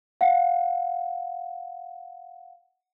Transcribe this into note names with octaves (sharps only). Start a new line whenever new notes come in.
F5 F#5